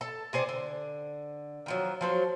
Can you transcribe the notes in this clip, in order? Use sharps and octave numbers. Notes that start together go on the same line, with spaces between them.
A4 A5
C3 G#4 C5 D5
D3
D#3 F3 F#3
F3 F#3 C5